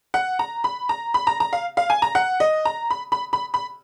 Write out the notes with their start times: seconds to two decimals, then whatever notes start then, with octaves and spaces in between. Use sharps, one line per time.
0.14 F#5
0.39 A#5
0.64 B5
0.89 A#5
1.14 B5
1.27 A#5
1.40 A#5
1.53 F5
1.77 F5
1.90 G#5
2.02 A#5
2.15 F#5
2.40 D#5
2.65 A#5
2.90 B5
3.12 B5
3.33 B5
3.54 B5